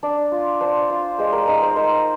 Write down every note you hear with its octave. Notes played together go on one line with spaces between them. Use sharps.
D4 D5
F4
D4 C5
F4
G#3 C5
A#4
D#4 C5
C5
D#4 A#4